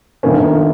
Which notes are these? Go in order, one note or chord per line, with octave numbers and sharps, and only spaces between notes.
G1 G2 D#3 A#3 C#4